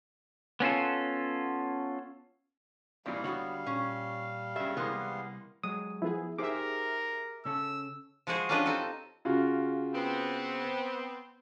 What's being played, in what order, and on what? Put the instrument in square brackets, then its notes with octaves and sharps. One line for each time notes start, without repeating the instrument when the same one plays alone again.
[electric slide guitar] B3 C#4 F4 A4
[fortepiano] G#1 A#2 E3 [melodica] G3 F5 [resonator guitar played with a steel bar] D5
[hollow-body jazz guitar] D3 F#4 F#5 [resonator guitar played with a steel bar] F#3 B3 [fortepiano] C#5
[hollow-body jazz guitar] A#2 [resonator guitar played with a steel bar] C#4
[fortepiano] G2 C#3 [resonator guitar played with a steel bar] E5
[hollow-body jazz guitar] C2 [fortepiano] E3 A#3 C5 [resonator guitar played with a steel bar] G#3 B3
[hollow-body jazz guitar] F#3 G#3 [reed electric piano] D#6
[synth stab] F3 B3 G#4 [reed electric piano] E4
[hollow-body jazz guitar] D#4 G4 C5 [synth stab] G#4 E5 [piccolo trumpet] A#4 [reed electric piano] D6
[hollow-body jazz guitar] C#3 C#4 A4 [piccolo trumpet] E6
[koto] F3 G#3 F#4 G#4 C5
C#4 D4 F4 G4 B4 D#5
C4 D#4 A4 D#5
[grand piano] C#3 F4 F#4
[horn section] B3 C4